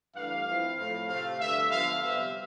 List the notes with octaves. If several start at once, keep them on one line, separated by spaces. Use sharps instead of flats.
G2 E3 A3 F5
F3 C4 E4
A2 F3 A3
C3 F3 A3 F5
G2 D3 A3 E5
D3 F3 B3 D4 F5
C3 G3 B3 E5